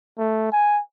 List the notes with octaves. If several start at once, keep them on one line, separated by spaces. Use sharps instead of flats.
A3
G#5